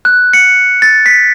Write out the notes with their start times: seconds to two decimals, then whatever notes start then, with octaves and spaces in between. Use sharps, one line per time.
0.05 F#6
0.33 C#7
0.82 A6
1.06 B6